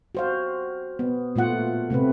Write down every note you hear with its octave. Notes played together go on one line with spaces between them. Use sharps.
F#4 C5 F5
B3
A#2 A3 F4 F#5
C3 A3 C4 B4